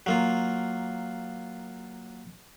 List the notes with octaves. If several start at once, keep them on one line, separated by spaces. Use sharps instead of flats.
F#3 A#3 F4